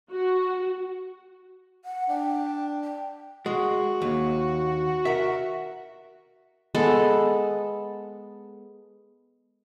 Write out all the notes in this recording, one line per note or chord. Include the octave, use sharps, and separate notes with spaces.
F#4
F#5
D4 G5
G5
G#3 F#4
D#2
A#4 E5
G#3 B3 A4